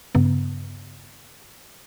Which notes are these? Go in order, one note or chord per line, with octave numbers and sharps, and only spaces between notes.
G2 C#3 B3